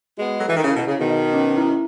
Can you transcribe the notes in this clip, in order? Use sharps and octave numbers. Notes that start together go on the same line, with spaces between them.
G#3 B3 F#4
F#3 A4
E3
D#3
C#3 E4
B2
C#3 G#4
B2 D#3
D#5
C#4
E4